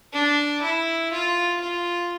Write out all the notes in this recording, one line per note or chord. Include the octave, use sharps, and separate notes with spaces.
D4
E4
F4
F4